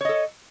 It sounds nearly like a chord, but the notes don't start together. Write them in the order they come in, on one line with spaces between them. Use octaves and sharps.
C#5 D#5 A4